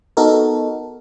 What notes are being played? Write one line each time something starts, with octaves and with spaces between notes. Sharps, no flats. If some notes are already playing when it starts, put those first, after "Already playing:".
B3 D#4 F#4 A4 A#4